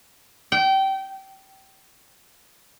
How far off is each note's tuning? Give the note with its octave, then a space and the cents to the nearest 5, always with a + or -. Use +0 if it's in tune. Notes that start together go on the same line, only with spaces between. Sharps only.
G5 -25